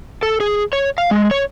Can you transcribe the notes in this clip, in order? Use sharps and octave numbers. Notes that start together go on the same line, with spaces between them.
A4
G#4
C#5
F5
G#3
C#5